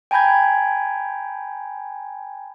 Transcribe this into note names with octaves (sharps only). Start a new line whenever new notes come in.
G5 G#5 A#5 B5 G6 G#6